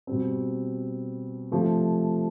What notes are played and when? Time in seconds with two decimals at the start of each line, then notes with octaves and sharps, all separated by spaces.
0.07 B2 G3 C4
1.52 C3 F3 A3